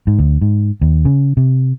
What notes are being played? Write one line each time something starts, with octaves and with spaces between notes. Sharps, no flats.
G#2
D2
G#2
D#2
C#3
C3